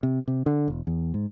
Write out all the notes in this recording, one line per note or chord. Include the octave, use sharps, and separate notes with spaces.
C3
C3
D3
E1
E2
G#2